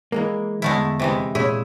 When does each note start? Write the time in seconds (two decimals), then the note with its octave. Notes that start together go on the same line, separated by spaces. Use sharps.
0.12 E3 G#3 A#3
0.62 E2 D3 G#3 A3 E4
1.00 C3 E3 G#3
1.35 A#2 E4 G#4 C#5